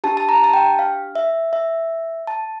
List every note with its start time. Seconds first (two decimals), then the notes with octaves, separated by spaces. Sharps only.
0.04 D4 G4 A5
0.17 A5
0.29 A#5
0.44 A5
0.53 G5
0.79 F5
1.15 E5
1.53 E5
2.27 A5